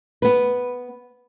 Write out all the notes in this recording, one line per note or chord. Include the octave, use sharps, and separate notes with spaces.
B3 B4